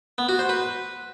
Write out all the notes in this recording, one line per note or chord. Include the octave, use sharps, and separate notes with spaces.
B3
F#4
C5
B4